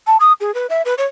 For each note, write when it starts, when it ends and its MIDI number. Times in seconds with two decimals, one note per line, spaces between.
0.07 0.17 81
0.20 0.33 87
0.40 0.54 68
0.54 0.67 71
0.70 0.82 76
0.85 0.94 71
0.98 1.06 73